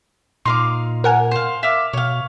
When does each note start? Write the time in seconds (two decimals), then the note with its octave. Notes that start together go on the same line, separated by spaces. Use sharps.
0.45 A#2 D#4 F5 C6 D6
1.04 A#4 F#5 G#5
1.31 C5 F5
1.63 E5 F5 D6
1.93 B2 C#5 F5